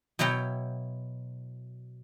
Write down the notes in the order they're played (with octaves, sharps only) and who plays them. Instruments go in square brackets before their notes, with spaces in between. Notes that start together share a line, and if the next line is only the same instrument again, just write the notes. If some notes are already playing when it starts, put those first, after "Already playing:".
[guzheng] B2 F#3 E4 C#5 G5